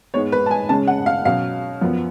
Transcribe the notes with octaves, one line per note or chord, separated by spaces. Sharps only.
G#2 G#3 B3 C#5
B4
A5
G#5
C#3 G#3 C#4 A5
F#5
F5
B2 F#3 C#4 F5
F#2 F3 B3